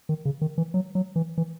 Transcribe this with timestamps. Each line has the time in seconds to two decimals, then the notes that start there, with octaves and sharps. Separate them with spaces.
0.09 D#3
0.25 C#3
0.41 D#3
0.58 E3
0.74 F#3
0.95 F#3
1.16 E3
1.38 E3